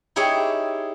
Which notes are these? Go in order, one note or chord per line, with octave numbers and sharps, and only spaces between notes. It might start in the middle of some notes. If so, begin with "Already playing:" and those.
D#4 E4 G4 G#4 C#5